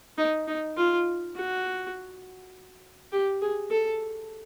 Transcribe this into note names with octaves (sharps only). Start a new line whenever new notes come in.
D#4
D#4
F4
F#4
G4
G#4
A4